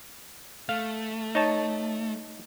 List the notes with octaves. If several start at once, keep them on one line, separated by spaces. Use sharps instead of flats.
A3 F5
D#4 C#5 A5